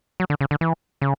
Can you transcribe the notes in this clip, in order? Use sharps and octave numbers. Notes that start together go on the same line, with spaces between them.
F#3
D3
C#3
D3
E3
C#3